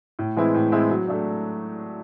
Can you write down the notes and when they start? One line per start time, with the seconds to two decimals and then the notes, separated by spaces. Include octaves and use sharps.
0.19 A2
0.36 E3 G#3 C4 E4
0.54 A2
0.72 E3 G#3 C4 E4
0.90 F#3
1.08 A3 D4